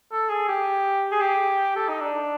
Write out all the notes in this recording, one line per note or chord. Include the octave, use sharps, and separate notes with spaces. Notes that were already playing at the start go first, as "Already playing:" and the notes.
A4
G#4
G4
G#4
G4
A4
D#4
D4